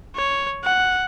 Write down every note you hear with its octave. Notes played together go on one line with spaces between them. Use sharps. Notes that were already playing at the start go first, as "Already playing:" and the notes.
C#5
F#5